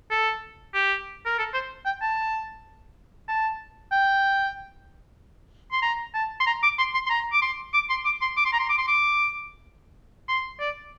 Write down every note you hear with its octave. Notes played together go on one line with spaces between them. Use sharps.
A4
G4
A#4
A4
C5
G5
A5
A5
G5
C6
A#5
A5
C6
A#5
D6
C6
C6
C6
A#5
D6
C6
D6
C6
D6
C6
D6
C6
A#5
C6
D6
C6
D6
C6
D5